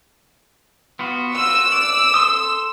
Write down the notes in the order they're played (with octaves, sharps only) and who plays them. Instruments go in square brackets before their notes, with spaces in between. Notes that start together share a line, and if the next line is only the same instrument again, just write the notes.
[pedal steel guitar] B3 F4 F#4
[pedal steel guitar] F4 F#4 [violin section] E6
[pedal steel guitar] D5
A4 C6 D#6